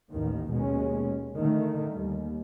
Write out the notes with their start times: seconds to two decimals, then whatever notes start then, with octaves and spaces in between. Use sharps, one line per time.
0.11 A1 D#2 D#3
0.50 D#2 B2 G#3 C#4
1.37 D3 D#3 A3
1.92 D#2 G3